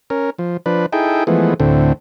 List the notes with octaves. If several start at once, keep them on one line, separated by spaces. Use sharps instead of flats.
C#4 A#4
F3
F3 D4 B4
D#4 E4 G#4 A4 G5
E3 F3 G#3 A3 B3
D2 A2 D3 C4